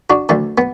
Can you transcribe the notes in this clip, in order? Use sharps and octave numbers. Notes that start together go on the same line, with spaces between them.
D4 F#4
D2 D3 A3
B3